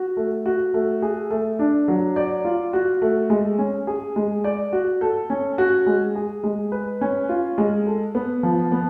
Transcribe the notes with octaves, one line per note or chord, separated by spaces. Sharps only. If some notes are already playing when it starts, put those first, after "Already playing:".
Already playing: F#4
A3
F#4
A3
G#4
A3
D4
F#3
D5
F4
F#4
A3
G#3
C#4
G#4
G#3
D5
F#4
A4
C#4
F#4
G#3
G#4
G#3
B4
C#4
F4
G#3
A4
B3
F3
B3